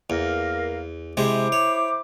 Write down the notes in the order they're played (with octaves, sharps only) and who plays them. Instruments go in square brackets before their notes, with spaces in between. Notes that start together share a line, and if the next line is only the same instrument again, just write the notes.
[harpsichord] E2 [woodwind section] A#3 A#4 F5
[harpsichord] C3 G#3 G#4 [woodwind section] E4 C5 D6
[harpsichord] C#5